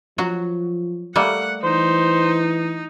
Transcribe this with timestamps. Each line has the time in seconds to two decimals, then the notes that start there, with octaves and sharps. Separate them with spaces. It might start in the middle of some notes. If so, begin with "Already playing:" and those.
0.18 F3 F#3 F#4
1.16 G3 A3 A#3 F#5
1.64 E3 D#4 C5